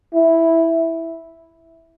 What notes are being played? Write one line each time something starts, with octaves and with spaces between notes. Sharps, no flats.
E4